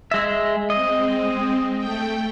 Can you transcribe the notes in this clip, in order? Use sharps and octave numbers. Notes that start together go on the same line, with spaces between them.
G#3 E5
G#3 C4 D#5
A3 G5